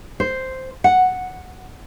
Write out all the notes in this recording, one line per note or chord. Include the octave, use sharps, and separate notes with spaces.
C5
F#5